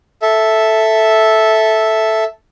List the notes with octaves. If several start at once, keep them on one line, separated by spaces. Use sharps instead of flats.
A4 E5